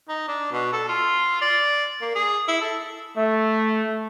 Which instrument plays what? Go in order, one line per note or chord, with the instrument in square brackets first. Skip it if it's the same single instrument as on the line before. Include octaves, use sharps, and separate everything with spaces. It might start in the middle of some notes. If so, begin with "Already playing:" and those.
[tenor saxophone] D#4
D4
B2
A4
F4
D5
A#3
G#4
E4
A4
[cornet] A3 [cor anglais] E5